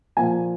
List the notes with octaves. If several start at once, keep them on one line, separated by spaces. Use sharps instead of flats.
A#2 F3 A#3 G#5